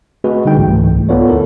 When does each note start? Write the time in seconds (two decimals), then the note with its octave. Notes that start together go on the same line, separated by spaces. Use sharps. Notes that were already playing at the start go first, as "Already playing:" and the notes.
0.24 A3 C4 F#4 G#4 B4 D#5
0.45 D3 G3 D#4 G5
0.57 C#2 G#2 E3 A3
0.95 C2
1.09 B3 F4 A4 C#5 D5
1.29 D2 E4 A4 A#4